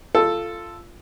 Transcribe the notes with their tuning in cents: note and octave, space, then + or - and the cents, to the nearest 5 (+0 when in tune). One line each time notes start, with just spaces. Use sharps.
F4 -15 A4 +0